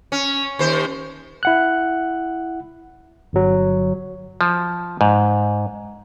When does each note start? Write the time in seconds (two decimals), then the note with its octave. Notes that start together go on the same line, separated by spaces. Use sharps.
0.12 C#4
0.59 D#2 C5
1.43 E4 F#5 F#6
3.33 G1 F#3
4.41 F3
5.01 G#2